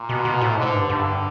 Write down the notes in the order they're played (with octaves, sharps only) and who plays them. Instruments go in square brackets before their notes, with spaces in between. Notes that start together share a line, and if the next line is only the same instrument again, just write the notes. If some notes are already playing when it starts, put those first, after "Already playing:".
Already playing: [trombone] A#2
[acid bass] B2
B2
A2
[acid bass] G#2 [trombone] D3
[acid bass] G2
[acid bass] G2 [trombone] D3